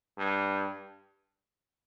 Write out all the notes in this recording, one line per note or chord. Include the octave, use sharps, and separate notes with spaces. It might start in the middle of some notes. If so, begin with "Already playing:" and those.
G2